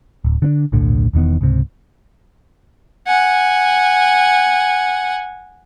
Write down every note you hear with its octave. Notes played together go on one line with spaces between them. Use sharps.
D1
D3 B3 D4
D#1 B1 A2 D3
E1 E2 D#3 B3
C#2 G#2 C3
F#5 G#5